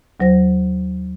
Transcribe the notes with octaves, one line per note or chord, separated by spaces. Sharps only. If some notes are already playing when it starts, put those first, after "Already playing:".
D#2 F#3 C5 A#6